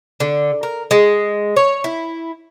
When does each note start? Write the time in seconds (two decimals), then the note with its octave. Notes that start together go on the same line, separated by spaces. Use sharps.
0.20 D3
0.63 A#4
0.91 G#3
1.56 C#5
1.84 E4